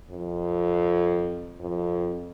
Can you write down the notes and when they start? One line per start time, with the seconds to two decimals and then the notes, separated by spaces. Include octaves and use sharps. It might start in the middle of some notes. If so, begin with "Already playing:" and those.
0.11 F2
1.61 F2